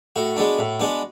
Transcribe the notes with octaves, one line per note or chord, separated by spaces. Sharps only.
A2 F#4
G#3 B3 D4
A2
G#3 B3 D4